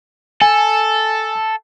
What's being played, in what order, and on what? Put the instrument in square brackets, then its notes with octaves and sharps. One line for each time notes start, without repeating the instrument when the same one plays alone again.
[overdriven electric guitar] A4 [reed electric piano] G#5